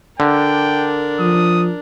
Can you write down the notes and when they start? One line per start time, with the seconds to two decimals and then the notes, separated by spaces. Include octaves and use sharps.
0.20 D3 D4 A#4 G5
1.19 F3 D#6